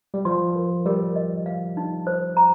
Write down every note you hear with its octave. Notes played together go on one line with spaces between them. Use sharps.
G3
F3 C6
A#4
G3 A#4
D#5
F5
D#4
C5
A#5